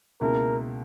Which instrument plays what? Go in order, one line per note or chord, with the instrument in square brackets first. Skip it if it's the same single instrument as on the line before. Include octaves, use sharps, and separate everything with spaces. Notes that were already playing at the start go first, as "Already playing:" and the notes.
[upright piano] C#2 B2 A#3 E4 [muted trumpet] A#4